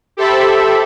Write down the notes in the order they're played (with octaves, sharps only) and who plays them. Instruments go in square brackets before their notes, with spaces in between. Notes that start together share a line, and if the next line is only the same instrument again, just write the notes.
[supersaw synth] G4 A4 C5 E5 A5 B5